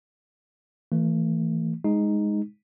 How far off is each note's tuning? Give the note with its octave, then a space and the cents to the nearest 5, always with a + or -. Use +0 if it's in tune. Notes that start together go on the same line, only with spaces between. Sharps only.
E3 +0 A3 +35
G#3 +0 D#4 +0